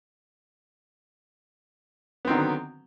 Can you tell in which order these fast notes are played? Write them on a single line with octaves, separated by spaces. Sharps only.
B3 C4 D#3 D3 F#3